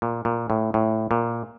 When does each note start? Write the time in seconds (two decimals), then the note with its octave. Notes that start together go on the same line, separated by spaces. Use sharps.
0.02 A#2
0.25 A#2
0.50 A2
0.74 A2
1.11 A#2